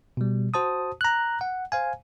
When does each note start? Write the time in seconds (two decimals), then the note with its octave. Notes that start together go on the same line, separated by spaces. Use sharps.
0.17 B2 G3
0.54 F#4 C5 A5 D#6
1.01 A#5 F#6
1.41 F#5
1.72 C5 F5 G#5